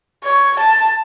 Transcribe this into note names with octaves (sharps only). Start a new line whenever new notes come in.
C#5
A5